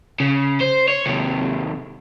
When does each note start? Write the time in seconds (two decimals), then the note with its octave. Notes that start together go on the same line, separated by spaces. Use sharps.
0.20 C#3
0.61 C5
0.88 C#5
1.06 D#2 C3